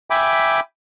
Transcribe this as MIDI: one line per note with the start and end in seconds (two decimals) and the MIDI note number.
0.10 0.60 76
0.10 0.60 79
0.10 0.60 80
0.10 0.60 83
0.10 0.60 86